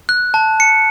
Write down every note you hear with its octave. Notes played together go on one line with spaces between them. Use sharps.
F#6
A5
C#7